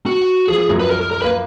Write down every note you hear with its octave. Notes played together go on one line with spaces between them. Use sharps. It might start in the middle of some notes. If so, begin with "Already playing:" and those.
F#4
F3 G#4
G#4
F#2 F#3
B4
A#4
A#4
A#4
A#3 B4